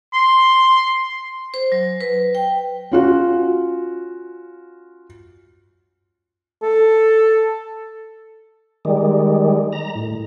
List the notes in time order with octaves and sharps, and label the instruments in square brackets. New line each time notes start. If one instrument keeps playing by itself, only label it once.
[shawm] C6
[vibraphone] C5
F#3
B4
G5
[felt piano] C#4 F4 F#4
[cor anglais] A4
[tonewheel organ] D#3 G3 G#3
A#5
A2